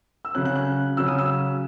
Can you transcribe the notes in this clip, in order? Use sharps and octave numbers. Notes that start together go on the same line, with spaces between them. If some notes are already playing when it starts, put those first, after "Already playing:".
E6
C#3 F#3 C#4 F#6
F#6
F#6
C#3 F#3 C#4 E6
D#6
E6